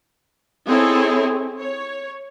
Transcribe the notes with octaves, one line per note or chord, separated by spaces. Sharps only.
C4 D#4 E4 G#4 A4 C#5
C#5